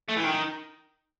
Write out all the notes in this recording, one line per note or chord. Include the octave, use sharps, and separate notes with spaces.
A3
E3
D#3